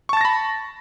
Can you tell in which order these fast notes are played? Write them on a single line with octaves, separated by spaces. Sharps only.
C#6 A5 A6 A#6 B5